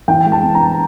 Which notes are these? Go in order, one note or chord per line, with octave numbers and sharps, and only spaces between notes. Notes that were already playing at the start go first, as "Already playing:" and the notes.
E3 G5
G#3
A5
B3
A#5
G2